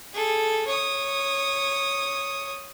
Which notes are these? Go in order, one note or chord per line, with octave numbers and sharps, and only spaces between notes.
G#4 A4
C#5 D#6